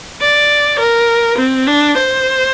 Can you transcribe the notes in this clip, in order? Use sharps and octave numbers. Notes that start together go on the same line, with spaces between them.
D5
A#4
C4
D4
C5